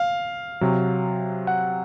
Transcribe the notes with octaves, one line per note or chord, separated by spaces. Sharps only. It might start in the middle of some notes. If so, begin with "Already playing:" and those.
Already playing: F5
C3 F#3
F#5